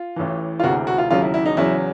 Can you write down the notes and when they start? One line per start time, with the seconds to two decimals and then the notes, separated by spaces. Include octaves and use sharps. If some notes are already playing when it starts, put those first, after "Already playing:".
Already playing: F4
0.16 A1 A2 E3
0.60 F4
0.63 E1 D2 C3 E3 F#4
0.87 F#4
0.98 F4
1.10 E1 D#2 C#3 F#3 F4
1.22 E4
1.34 E4
1.46 D#4
1.57 E2 C#3 F#3 E4